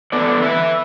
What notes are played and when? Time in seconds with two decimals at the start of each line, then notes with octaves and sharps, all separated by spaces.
0.12 E2 D3 B3 A4 D5
0.42 B4 E5